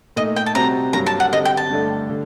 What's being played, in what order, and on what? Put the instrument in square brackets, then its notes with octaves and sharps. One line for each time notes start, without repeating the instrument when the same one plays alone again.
[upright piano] A#2 A3 D#4 [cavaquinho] D#5
[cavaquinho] G5
A5
[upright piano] C3 G3 C4 F#4 [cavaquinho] A#5
[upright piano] G2 F#3 A#3 [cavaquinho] A#5
[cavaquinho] A5
F#5
[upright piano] D3 G3 C4 [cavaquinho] D#5
[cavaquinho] G5
A5
[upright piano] G2 D3 A3 D4
D3